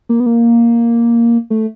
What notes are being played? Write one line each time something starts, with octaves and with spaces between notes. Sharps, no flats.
A#3
B3
A#3
A3